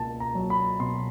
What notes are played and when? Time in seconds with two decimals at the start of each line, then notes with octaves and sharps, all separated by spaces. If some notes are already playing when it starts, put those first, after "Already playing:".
Already playing: C#2 B2 A#3 A5
0.20 A#5
0.35 F#3
0.50 B5
0.80 B2 C6